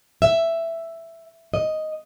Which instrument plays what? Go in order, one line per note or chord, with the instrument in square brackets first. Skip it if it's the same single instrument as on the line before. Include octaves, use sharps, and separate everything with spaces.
[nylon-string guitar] E5
D#5